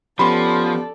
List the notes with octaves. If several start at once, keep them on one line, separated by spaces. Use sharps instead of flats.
F3 B3 C#4 G4 A4 D5 B5 C6